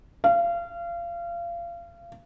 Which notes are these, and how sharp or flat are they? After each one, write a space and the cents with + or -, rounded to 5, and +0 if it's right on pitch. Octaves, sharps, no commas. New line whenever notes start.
F5 -30